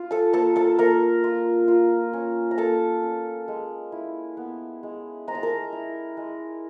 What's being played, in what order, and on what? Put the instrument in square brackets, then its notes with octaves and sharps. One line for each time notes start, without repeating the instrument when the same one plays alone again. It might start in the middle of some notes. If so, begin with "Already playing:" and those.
Already playing: [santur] F4
A4 A5
A#3 A4 A5
A4 A5
A#3 A#4 A#5
F4
F4
C#4
A#5
A#3 A4 A5
C#4
G#3
E4
B3
G#3
G#3 A#5
A5
A#4 A#5
E4
G#3